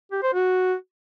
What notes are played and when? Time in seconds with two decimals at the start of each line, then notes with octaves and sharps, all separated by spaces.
0.11 G4
0.22 C5
0.33 F#4